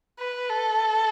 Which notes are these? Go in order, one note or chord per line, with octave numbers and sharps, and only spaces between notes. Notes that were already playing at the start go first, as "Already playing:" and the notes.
B4
A4